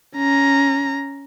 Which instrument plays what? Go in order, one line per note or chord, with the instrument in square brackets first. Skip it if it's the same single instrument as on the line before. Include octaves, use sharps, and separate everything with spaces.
[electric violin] C#4 A#5